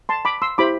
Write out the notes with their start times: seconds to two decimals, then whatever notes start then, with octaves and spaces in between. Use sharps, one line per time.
0.09 A5 C6
0.25 B5 D6
0.42 C6 E6
0.58 E4 G4 C5 B5 D6